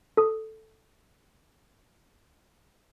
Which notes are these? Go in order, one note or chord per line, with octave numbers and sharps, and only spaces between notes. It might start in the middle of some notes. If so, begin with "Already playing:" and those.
A4 D#6